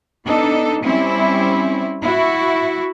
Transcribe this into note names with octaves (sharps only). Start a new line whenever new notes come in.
B3 D4 D#4 A4
G3 C4 C#4 E4
E4 F#4